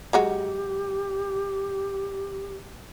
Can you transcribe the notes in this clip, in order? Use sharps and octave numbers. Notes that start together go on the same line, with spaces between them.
F#3 G#3 F#4 G4